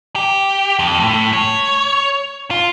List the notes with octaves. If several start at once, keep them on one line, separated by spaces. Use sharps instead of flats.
G4
F2
A2
C#5
F4